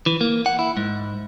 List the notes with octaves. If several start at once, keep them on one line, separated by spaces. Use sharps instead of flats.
E3
A#3
F#5
E4
G#2